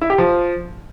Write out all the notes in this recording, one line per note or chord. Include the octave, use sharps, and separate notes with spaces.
E4
G4
F3